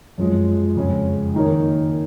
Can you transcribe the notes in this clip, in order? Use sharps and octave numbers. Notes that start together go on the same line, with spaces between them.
F#2 F3 G#3
F2 C#3 G#3 C#4
D#3 A#3 D#4 A#4 C#5